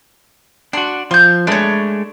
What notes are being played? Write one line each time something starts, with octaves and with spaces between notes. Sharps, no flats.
D4 F#4 C6
F3 C6 G6
G#3 A3 D4 B4 C#5